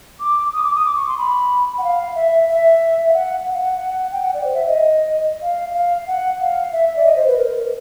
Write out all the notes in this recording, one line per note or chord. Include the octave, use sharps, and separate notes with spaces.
D6
D#6
D6
D#6
D6
C#6
C6
B5
F#5
F5
E5
E5
F5
F#5
F#5
F5
F#5
G5
F#5
D5
C5
E5
D#5
F5
F5
F#5
F5
E5
D5
D#5
C5
B4
A#4